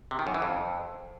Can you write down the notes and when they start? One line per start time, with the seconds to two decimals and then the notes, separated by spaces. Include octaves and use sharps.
0.11 C3
0.19 D#3
0.27 F#2
0.34 E3
0.42 F2